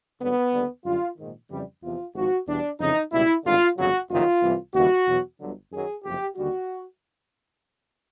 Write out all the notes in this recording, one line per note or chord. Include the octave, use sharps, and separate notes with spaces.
G#1 G2 D3 F#3 B3
D#2 D3 G3
F#2 D3 G3 F4
A#1 G#2 D#3
F2 C#3 E3 G3
E2 C3 F3 F4
G#1 G#2 F3 F#4
E2 B2 G3 D4
F2 C#3 E3 D#4
C#2 B2 G3 E4
G#1 G2 D3 F4
G1 F2 C#3 F#3 F#4
F#1 F2 C3 D#3 F#3 F4
C2 C3 E3
D#2 C#3 E3 G3 F#4
E2 B2 F#3
G1 G2 D3 F#3
F#2 D#3 F#3 G#4
F#1 F2 C3 G4
D#2 D3 G3 F#4